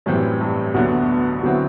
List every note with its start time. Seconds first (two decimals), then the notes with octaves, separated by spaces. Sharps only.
0.06 F#2 A2 E3 G3 C4
0.40 G2
0.74 D2 B2 D3 F#3 B3
1.43 B2 D3 F#3 C4 E4